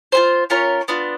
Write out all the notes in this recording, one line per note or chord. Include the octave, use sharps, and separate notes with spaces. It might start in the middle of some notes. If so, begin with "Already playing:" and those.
F4 G#4 C5
C#4 F4 A#4 C#5
B3 D4 F4